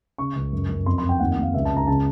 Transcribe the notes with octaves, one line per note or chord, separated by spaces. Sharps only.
C#3 C#6
C#2
F#2
F#2
F2 C6
C6
F2
G5
D#2 F#5
F#5
D#2 F5
C#2 E5
A5
C#2
A#5
C#3 A5